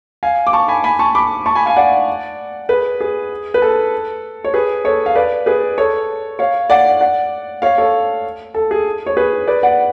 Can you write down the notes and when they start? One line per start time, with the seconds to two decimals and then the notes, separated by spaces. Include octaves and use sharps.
0.23 F5 G#5
0.47 D6
0.53 A5 C#6
0.68 G#5 B5
0.84 G#5 B5
0.99 A5 C#6
1.15 B5 D6
1.46 A5 C#6
1.55 G#5 B5
1.66 F5 G#5
1.76 D5 F#5
2.69 G#4 B4
3.01 G#4
3.54 B4
3.62 A4
4.44 C#5
4.54 G#4 B4
4.84 A4 C#5
5.06 F5
5.15 B4 D5
5.46 G#4 B4
5.78 A4 C#5
6.39 C#5 F5
6.70 D5 F#5
7.01 D5 F#5
7.62 C#5 F5
7.78 A4 C#5
8.54 A4
8.71 G#4
9.06 C#5
9.17 G#4 B4
9.47 B4 D5
9.63 D5 F#5